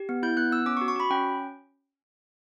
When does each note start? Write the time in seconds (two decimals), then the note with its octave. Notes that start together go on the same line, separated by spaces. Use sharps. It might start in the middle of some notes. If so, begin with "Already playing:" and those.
Already playing: G4
0.09 B3
0.23 E4 G6
0.37 B3 F#6
0.52 B3 E6
0.66 C#4 D6
0.77 C#6
0.81 F#4
0.88 C#6
0.96 F#4 B5
1.10 C#4 G5